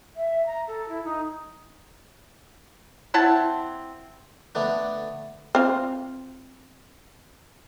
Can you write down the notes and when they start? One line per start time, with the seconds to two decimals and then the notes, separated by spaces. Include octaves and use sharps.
0.16 E5
0.46 A#5
0.68 A4
0.89 E4
1.05 D#4
3.14 C4 E4 F#5 A5
4.55 D3 A3 B3 D4
5.55 C4 F4